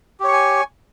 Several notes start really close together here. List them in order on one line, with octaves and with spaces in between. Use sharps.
G4 C#5 C#6 G#5